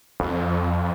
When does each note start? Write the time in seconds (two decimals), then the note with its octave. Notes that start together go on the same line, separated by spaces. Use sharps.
0.20 F2